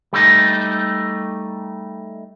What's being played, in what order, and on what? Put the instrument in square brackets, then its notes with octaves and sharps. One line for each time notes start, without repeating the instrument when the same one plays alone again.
[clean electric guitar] G3 A3 D#4